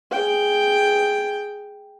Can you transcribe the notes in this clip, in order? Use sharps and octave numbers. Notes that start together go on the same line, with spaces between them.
G#4 G5